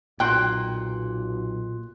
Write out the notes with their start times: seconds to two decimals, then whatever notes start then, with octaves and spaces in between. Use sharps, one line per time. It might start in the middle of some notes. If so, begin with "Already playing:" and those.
0.20 B1 A#2 G5 C6 F#6